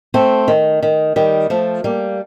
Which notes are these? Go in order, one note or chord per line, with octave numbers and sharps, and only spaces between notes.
A3 C4
D#3
D#3
D#3 G3
F3 A3
G3 A#3